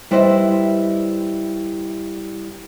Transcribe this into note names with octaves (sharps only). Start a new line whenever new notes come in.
G3 E4 B4 C5 D#5 E5